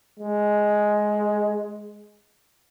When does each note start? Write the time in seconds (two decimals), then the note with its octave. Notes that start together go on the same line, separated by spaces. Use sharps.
0.19 G#3